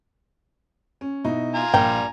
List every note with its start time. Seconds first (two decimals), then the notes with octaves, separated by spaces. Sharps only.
1.01 C#4
1.24 B2 D#4 E4
1.55 F4 G#5 A#5
1.74 A#1 G3 A#4 G5